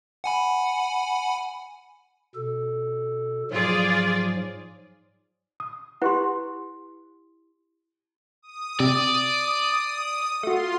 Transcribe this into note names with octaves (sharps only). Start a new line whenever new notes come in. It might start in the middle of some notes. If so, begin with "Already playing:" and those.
F#5 G#5 B5
B2 A4
G#2 F3 F#3 F4 G#4 D5
D#6
E4 G4 B4 F#5 C6
D#6
C3 D5
D#6
A3 F4 F#4 C6